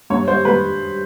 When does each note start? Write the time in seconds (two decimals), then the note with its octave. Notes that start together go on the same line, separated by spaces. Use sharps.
0.10 G2 C#5
0.28 G3 C5
0.45 G3 B4